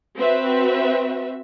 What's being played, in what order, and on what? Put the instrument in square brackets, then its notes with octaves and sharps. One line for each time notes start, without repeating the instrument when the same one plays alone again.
[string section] C4 F#4 B4 E5